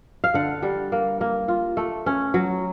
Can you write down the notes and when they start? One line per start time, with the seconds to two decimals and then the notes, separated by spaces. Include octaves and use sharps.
0.24 F5
0.34 D3 F#5
0.62 G3
0.92 A#3
1.21 A#3
1.48 F4
1.77 A3
2.06 C#4
2.34 F#3